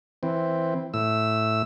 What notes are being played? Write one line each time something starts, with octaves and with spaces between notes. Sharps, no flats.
E3 C4
A2 E6